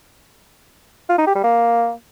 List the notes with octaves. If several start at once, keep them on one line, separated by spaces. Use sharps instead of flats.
F4
D#4
G4
G3
A#3